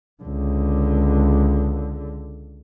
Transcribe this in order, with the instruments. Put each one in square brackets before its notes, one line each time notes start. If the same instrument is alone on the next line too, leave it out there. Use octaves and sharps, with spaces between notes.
[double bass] C#2 D3